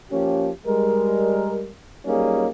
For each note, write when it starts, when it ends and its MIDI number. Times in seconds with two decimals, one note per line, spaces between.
0.10 0.49 53
0.10 0.49 58
0.10 0.49 61
0.10 0.49 67
0.66 1.69 55
0.66 1.69 56
0.66 1.69 70
2.05 2.48 54
2.05 2.48 55
2.05 2.48 58
2.05 2.48 61
2.05 2.48 63
2.05 2.48 68